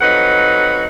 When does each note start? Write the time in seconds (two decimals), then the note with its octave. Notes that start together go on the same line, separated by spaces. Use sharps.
0.01 F2 F#3 D#4 B4 F#5